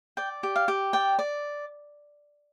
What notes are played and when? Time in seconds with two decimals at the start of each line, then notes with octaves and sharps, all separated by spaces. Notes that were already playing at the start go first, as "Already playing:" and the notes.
0.17 D5 G5
0.43 G4
0.56 F5
0.68 G4
0.93 D5 G5
1.19 D5